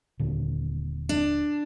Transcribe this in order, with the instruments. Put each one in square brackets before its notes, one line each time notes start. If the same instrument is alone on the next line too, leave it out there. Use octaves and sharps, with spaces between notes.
[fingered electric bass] D#1 A#2 D3
[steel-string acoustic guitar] D4